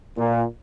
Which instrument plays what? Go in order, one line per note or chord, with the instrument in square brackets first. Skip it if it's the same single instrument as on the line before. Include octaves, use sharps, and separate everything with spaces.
[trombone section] A#2